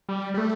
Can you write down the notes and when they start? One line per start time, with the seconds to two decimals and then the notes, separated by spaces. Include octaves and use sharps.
0.09 G3
0.34 G3
0.38 A3